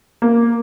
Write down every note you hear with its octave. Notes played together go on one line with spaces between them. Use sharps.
A#3